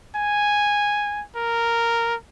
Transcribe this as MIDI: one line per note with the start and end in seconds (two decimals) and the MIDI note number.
0.16 1.22 80
1.36 2.15 70